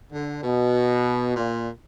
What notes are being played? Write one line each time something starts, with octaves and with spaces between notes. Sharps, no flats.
D3
B2
A#2